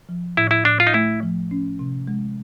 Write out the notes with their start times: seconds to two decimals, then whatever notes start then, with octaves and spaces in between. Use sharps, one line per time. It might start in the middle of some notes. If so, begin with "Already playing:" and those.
0.09 F3
0.37 A2 E4
0.51 E4
0.65 A2 D4
0.80 F4
0.87 D#4
0.94 A3 E4
1.23 F3
1.51 C#4
1.79 C3
2.07 G#3